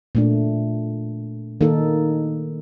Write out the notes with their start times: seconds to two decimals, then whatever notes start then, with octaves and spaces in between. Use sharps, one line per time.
0.15 A#2 A3 D4
1.61 D#3 A#3 D#4 A4